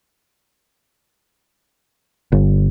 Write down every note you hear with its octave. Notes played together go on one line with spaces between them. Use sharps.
G1